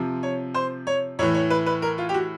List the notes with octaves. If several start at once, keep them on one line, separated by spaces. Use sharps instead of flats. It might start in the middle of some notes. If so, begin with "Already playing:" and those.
Already playing: C3 F3
C#5
C5
C#5
A2 E3 C#5
C#5
B4
B4
A#4
F4
G4
F#4